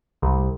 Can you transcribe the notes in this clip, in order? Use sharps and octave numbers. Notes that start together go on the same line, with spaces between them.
C2